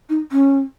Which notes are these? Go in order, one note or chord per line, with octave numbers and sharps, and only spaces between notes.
D#4
C#4